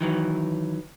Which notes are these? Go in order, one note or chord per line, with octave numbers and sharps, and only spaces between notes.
D#3 E3 F#3